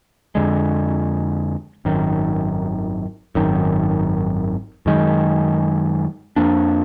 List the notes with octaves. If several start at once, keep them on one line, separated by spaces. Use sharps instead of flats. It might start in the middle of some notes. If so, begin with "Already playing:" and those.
F2 D3 G#3
G#1 F#2 D#3
G#1 F#2 D#3
F#2 D#3 G#3
F2 F3 A#3 D4